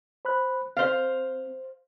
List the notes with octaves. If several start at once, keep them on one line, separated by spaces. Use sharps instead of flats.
C5 B5 F#6
C4 C5 F5